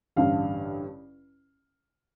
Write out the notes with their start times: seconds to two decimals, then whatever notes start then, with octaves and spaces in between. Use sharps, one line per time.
0.16 A1 G2 D3 F5